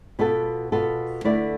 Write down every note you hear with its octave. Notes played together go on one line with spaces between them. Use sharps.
B2 B3 F4 A4
B2 B3 F4 A4
D3 A3 E4 B4 D5